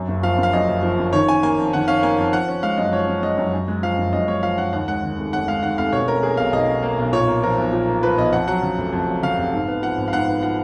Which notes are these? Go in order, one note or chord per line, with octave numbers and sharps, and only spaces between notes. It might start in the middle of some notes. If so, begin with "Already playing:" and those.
Already playing: F#2
F#1
F3 F5
F#1
F5
F#2 D#5
F#1
F3
F#1
D#3 C#5
C#4 G#5
A#3 G#5
F2
D#3 F#5
C#4 F5
A#3 G#5
F2
F3 F#5
C#4
G#3 F5
F#2 D#5
F3 C#5
C#4
G#3 D#5
F#2
F#2
G#3
F3 F5
F#1
F#2 D#5
G#3 C#5
F3 F5
F#1 F#5
D#2 F#5
G#3 F#5
D#3
F1
D#2 F#5
G#3 F5
D#3 F#5
F1 F5
B2 C#5
C#4 A#4
A#3 G#4
B1 F5
B2 D#5
C#4
A#3
B1
A#2 C#5
A#3
F3 A#4
B1
A#2
A#3
F3 B4
B1 D#5
F2 F#5
F#3 F#5
C#3
F1
F2
F#3
C#3 F5
F1
G#2
B3
F3 F#5
G#1
F5
G#2 F#5
B3
F3 F#5